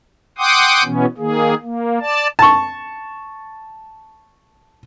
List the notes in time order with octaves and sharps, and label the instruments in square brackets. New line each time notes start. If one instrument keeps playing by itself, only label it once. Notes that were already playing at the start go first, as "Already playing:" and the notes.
[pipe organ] F#5 G5 C6 D6 D#6
B2 E3 B3 C#4
D#3 A#3 G#4
A#3
D5 A5
[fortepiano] A5 C#6